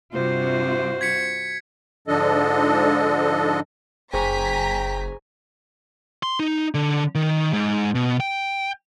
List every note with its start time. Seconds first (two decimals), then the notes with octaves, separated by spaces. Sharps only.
0.13 G2 C3 F4 F#4 C5
1.01 G#6 B6 C#7
2.08 G#2 D3 F3 D4 A4 D#5
4.13 F#1 G#4 C5 G5 G#5 A#5 C#6 B6
6.23 C6
6.40 D#4
6.74 D3
7.15 D#3
7.53 G#2
7.95 B2
8.20 G5